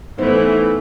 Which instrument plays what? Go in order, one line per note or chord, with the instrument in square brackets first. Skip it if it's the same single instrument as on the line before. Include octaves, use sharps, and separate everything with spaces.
[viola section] E3 [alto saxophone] A3 [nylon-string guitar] B3 D#4 C5